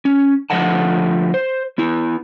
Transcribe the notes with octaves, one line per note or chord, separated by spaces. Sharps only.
C#4
D3 F3 A3 D#5 F#5 A5
C5
B3 E4